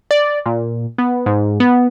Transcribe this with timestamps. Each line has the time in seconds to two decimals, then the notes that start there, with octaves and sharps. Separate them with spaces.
0.11 D5
0.46 A#2
0.98 B3
1.26 G#2
1.60 B3